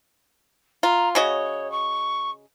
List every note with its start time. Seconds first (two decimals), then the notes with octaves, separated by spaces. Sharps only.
0.83 F4 A#5
1.15 C#3 F#4 C#5 D#5
1.71 C#6